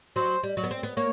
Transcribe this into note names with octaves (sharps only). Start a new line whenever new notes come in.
F#3 C5
G3
F#3
B3
C4
B3
A#3 C#5